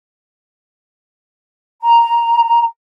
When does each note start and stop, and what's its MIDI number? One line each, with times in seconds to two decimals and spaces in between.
1.81 2.65 82